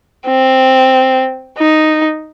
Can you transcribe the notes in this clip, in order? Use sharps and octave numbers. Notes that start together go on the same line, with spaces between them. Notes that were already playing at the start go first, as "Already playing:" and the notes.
C4
D#4